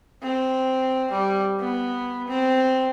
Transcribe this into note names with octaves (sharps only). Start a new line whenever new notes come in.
C4
G3
B3
C4